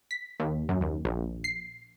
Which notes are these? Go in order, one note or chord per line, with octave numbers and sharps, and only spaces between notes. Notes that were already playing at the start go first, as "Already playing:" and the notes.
B6
D#2
F#2
D#2
A#1
C7